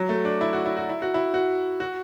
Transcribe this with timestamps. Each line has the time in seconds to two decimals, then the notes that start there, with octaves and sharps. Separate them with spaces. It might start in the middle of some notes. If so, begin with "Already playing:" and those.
Already playing: F#3
0.09 A3
0.25 D4
0.41 E4
0.53 F#4
0.66 E4
0.77 F#4
0.89 E4
1.02 F#4
1.14 E4
1.34 F#4
1.80 F#4